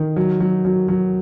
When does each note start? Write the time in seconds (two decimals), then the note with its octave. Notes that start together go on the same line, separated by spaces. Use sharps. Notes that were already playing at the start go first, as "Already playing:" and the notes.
Already playing: D#3
0.16 F#3
0.40 F#3
0.65 F#3
0.88 F#3